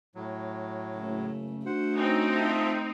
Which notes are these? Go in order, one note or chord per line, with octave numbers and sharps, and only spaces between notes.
A2 F#3
F#1 C#3 A3
A3 D4 F#4 C5 F#5
C4 C#4 D#4
F4 A4 E5